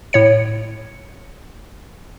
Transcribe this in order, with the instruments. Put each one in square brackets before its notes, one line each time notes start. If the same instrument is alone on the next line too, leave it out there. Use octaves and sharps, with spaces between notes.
[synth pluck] A2 C#5 C#7